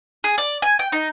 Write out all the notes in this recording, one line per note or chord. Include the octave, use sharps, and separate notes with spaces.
G#4
D5
G#5
G5
D#4